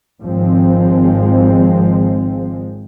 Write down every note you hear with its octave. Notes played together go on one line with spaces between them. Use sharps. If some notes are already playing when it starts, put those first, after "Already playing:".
G#1 G#2 F3 G#3 C4